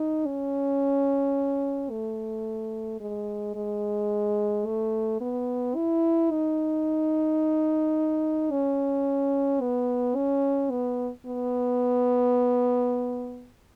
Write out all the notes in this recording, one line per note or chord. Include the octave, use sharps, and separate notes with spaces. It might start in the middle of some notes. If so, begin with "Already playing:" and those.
Already playing: D#4
C#4
A3
G#3
G#3
A3
B3
E4
D#4
C#4
B3
C#4
B3
B3